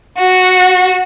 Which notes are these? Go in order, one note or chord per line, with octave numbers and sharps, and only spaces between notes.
F#4